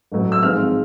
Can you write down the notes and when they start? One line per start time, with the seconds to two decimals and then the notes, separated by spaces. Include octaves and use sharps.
0.12 A1 A2 F#3 A3
0.32 E6
0.42 G#1 G#2 F3 G#3 C4 F6